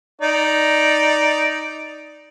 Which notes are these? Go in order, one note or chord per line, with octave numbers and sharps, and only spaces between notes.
D#4 D5